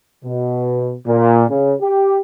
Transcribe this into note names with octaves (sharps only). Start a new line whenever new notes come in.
B2
A#2
C#3
G4